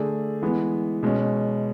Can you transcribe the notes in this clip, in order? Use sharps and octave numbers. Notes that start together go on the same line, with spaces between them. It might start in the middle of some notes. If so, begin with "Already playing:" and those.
Already playing: D3 A3 D4 G#4
E3 G#3 B3
B2 G#3 C#4